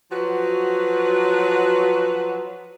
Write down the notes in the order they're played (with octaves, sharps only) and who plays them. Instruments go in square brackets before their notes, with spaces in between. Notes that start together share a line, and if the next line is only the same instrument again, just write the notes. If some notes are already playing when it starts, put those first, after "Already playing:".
[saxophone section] F3 F#3 F#4 B4